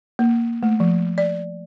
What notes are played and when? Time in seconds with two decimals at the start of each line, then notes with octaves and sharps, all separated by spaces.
0.19 A#3
0.63 A3
0.80 F3
1.18 D5